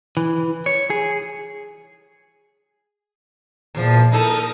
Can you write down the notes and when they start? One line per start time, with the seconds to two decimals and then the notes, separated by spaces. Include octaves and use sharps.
0.17 E3
0.66 C#5
0.90 G#4
3.75 E2 A#2 F3
4.12 D#4 E4 A4 A#4 D#6